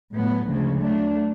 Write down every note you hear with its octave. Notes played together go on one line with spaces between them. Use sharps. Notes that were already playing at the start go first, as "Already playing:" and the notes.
A2 F#3 B3
D2 C#3 F3 G#3
F#3 A3 D4